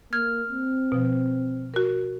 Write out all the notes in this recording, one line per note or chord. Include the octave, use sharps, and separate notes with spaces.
A#3 F6 G#6
C4
B2 F3
F#4 A#4